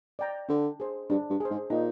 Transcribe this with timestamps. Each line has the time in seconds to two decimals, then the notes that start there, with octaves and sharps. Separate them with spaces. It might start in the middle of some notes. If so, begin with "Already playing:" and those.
0.19 D5 G5 A#5
0.49 D3 D4
0.80 G#4 C5
1.10 G2 D4
1.30 G2
1.40 G#4 C5
1.50 G#2
1.70 A#2 D#4